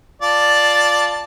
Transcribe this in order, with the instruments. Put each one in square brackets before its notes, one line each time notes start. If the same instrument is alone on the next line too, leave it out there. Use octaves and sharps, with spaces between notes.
[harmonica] F4 D5 A5